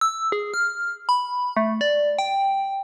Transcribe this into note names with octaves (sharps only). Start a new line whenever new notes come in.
E6
G#4
F6
B5
A3
D5
G5